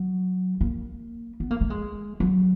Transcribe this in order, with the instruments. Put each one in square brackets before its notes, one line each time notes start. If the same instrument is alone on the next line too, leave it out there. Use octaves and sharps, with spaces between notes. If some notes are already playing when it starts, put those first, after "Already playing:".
Already playing: [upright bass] F#3
A#3
B3
A#3
A3
G#3
F#3